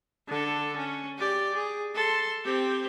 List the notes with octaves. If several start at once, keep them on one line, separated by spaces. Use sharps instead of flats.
D3 A4
C#4
G4 D5
G#4
A4 C6
C4 G4